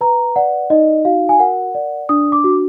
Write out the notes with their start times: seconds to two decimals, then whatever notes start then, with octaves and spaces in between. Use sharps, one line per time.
0.01 B4 A#5
0.36 D5 F#5
0.70 D#4 D#5
1.05 F#4 F5
1.29 G#5
1.39 A#4 F#5
1.75 D5
2.09 D4 D#6
2.32 D6
2.44 F#4